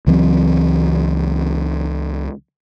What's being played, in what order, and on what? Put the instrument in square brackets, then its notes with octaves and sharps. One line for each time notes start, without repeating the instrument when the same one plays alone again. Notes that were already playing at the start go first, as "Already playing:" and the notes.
[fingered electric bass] C#2 E3 F#3 C4